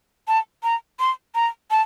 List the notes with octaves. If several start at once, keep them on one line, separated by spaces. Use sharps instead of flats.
A5
A#5
C6
A#5
A5